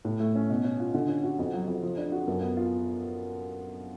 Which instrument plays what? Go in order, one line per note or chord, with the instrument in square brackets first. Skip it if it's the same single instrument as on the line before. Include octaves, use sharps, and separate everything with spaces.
[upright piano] A2
A3
C#4
B2
C#4
F4
D3
C#4
F#4
F2
F#3
F2
F3
D4
F#4
F#2
B3
F4